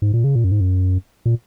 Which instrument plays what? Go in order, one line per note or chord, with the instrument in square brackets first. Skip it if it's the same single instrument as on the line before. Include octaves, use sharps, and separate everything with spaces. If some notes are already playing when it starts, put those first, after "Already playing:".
[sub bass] G#2
A#2
C#3
A#2
F#2
G#2
F#2
A#2